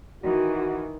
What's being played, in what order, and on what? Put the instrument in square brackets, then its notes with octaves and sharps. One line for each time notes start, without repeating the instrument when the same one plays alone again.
[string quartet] D#3 E3 [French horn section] F#4